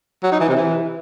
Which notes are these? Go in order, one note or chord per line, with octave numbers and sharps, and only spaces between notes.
F#3
D#4
E3
C3
E3